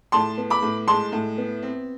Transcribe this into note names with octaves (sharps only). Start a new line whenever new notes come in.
A2 A5 C6
B3
B5 D6
A2
G#3 A5 C6
A2
B3
C4